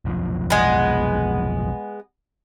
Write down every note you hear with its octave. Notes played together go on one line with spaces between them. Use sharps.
F1 B1 F3
G#3 B3